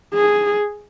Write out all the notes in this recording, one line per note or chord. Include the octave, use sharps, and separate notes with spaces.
G#4